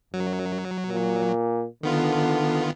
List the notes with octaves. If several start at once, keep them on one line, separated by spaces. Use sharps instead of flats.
F#2 F#3
A#2
D3 D#3 B3 F4